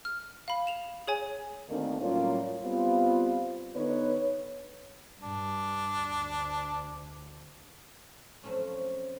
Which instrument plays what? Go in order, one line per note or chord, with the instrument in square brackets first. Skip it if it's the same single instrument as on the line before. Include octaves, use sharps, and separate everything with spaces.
[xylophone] F6
F5 B5
E7 F7
G#4 C#5 G#5
[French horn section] D2 D#3 A3 A#3 C4 D4
A2 F#3 G3 A#3 C#4 F4
G3 B3 C4 F4
D3 B3 D#4 B4 C#5
[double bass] G2 [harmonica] D4
[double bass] D2
[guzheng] F3 F#3 A3 C4 C#4